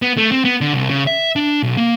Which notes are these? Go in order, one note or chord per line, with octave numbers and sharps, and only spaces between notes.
B3
A3
C4
B3
D3
C2
C#3
E5
D4
B1
A#3